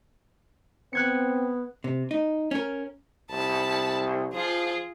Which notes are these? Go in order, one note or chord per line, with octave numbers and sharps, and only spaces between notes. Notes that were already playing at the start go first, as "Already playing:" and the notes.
B3 C4 F#6 G#6 C#7
C3
D#4
C#4 A#4
C2 A5 B5
F3 F4 G#4